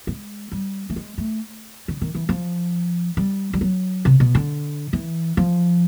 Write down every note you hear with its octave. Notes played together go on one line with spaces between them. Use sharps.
G#3
G3
A3
G#3
A3
D3
D#3
E3
F3
G3
G3
F#3
C3
B2
D3
E3
F3